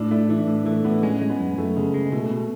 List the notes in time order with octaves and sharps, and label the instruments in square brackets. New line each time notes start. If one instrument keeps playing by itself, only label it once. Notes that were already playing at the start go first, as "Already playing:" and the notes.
Already playing: [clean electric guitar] A2 [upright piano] D4
[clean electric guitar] A3 [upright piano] E4
[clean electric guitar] E3 [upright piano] D4
[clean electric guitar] A2
[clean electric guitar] E3 [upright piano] A3
[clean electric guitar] A2 [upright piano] B3
[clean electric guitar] G#3 [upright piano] C#4
[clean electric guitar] G#3
[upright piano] B3
[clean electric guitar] F#2
[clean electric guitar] F#2 [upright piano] A3
[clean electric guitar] C#3 [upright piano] G#3
[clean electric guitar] G#3
[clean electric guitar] B2 [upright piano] A3
[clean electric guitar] B2